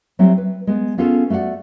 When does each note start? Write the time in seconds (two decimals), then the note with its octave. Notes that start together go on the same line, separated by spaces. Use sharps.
0.19 F#3 G3 A3 C4 E4
0.38 B4
0.67 G#3 B3
0.98 B3 C#4 F4 G#4 A4
1.30 A3 F#4 C#5 D5 F#5